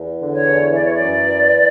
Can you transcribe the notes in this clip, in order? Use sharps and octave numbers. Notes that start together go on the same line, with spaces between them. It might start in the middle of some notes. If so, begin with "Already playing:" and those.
Already playing: E2
D3
C#5
E2
E3 D5
C#5
D5
F#2
E3